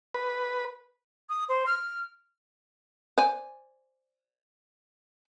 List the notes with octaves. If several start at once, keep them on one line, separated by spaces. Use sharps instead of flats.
B4
D#6
C5
F6
C5 D5 G#5